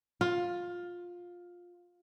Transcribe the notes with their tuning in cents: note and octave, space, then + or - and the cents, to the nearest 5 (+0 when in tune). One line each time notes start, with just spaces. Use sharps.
F4 +15